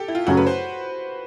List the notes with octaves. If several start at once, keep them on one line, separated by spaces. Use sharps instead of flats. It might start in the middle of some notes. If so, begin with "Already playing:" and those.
Already playing: G4 A4
E4
F4
F#2 C#3 F#3 A3 C#4 F#4
B4
C5